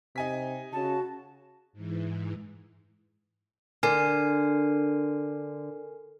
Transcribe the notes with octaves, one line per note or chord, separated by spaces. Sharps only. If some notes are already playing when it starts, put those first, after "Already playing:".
C3 D#4 G#5 B6
C#3 F#4 A5
G#2 E3
D3 A#4 G#5 C7